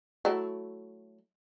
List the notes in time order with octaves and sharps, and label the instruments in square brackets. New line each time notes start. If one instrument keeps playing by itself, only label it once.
[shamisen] F#3 A3 E4